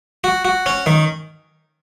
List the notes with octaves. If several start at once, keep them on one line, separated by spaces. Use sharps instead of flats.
F#4
F#4
C#4
D#3